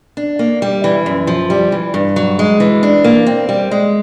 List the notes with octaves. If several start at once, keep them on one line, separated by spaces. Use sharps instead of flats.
D4
A#3
G3
E3
F#2
F3
G3
E3
G2
F#3
G#3
E3
D4
A#3
C4
G3
G#3